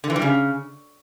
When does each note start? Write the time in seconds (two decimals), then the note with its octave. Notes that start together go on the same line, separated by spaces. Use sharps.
0.04 D3
0.10 E3
0.16 G3
0.22 C#3